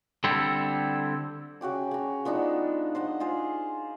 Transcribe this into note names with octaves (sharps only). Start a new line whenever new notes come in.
D3 G3 C4 E4 A4
C#3 F#4 G5 D6
C#3 A#5
F3 B3 D4 D#4
C5 D#5 F#5
F4 G#4 C5